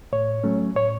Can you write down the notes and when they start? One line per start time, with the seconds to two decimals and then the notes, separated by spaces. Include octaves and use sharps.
0.13 A2 C#5
0.44 F#3 A3 C#4
0.76 A2 C#5